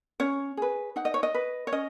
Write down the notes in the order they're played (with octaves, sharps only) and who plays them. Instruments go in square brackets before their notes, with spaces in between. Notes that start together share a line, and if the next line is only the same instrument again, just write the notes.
[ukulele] C#4 C#5
G#4 B4
D#4 F#5
D#5
C#5
D#5
B4
C#5
C#4 D#5